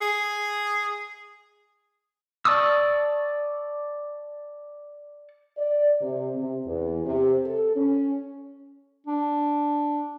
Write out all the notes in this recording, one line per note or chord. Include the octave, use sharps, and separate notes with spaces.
G#4
D5 A5 C#6 D#6 E6
D5
C3
C3
E2
C3
A4
C#4
D4